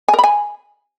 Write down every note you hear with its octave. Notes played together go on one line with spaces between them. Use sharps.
G#5
A#4
B5
G#5